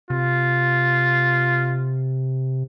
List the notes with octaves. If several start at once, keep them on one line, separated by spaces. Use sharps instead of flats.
C3 F4